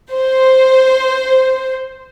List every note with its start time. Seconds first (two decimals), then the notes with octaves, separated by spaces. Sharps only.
0.12 C5